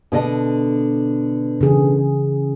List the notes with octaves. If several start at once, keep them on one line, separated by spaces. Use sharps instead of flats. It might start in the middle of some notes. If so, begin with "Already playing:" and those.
B2 D3 D#5
C#3 E3 G#4